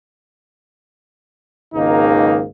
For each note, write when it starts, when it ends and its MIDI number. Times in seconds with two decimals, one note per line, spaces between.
1.74 2.45 32
1.74 2.45 37
1.74 2.45 44
1.74 2.45 51
1.74 2.45 58
1.74 2.45 63